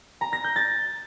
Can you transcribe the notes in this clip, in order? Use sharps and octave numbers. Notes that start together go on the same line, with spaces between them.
A#5
A#6
G6
A6